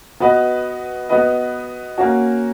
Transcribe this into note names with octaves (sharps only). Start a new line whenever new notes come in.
B3 F#4 B4 D#5
B3 F#4 B4 D#5
A#3 C#4 F#4